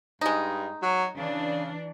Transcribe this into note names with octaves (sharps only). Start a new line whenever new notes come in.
G2 G#3 D#4
F#3
C#3 E3 D4